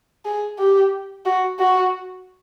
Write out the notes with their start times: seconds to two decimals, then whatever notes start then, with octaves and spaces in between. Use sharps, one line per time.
0.25 G#4
0.59 G4
1.25 F#4
1.59 F#4